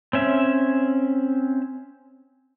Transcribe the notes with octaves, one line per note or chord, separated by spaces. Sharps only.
C4 C#4 E5